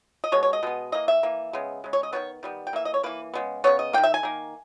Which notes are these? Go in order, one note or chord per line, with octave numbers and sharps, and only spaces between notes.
D#5
B2 G#3 C#5
C#5
D#5
B2 G#3 B3
E3 A#3 D#5
E5
E3 A#3
C#3 G#3 B3
C#3 G#3
C#5
D#5
D#3 G3 B3 C#5
D#3 G3 B3
G5
E3 A#3 E5
D#5
C#5
E3 A#3 B4
C#3 G#3 B3
C#3 G#3 B3 C#5
D#5
D#3 A#3 G5
E5
G#5
D#3 A#3